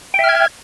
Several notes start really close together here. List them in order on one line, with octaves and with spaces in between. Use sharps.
G5 E5 F6 G#6